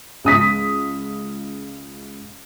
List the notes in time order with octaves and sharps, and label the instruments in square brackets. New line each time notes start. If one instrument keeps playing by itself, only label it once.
[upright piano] C#2 D#6 B6